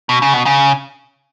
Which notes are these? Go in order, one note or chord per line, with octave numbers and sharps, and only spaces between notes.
B2
C#3
B2
C#3